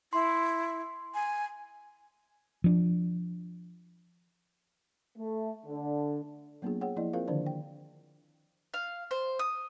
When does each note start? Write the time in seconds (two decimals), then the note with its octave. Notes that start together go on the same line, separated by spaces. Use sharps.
0.13 E4 C6
1.14 G#5
2.64 F3 D4
5.18 A3
5.66 D3
6.62 F#3 A#3 B3 D4 F4 G#4
6.81 G#4 C#5 F#5 G5
6.96 F3 A#3 E4 D5 D#5
7.13 C4 F4 G#4 A#4 C5 F5
7.28 D3 D#3 F3 D4 C5 D5
7.46 G5
8.74 F5
9.11 C5
9.39 D#6